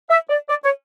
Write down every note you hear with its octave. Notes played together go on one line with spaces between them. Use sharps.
E5
D5
D5
C#5